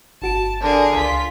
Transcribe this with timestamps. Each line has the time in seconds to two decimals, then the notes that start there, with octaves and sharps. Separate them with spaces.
0.22 G1 F#4 A5 D7
0.61 D3 G#4 A#4
0.96 C#2 F4 B6